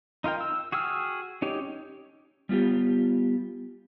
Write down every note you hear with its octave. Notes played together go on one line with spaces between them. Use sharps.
D#4 F4 A#4 G5
E6
F#4 G#4 G5 E6 F6
C#4 D#4 G4 C#5
G3 B3 F4 G4